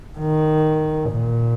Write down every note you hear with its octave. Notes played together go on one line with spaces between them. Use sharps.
D#3
A#2